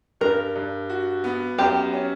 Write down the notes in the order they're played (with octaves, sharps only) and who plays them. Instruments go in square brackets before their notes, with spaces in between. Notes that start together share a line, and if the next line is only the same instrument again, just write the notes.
[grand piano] G2 [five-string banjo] A#4
[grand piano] G2
F#4
B3
[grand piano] F#2 [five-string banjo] G4
[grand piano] C#4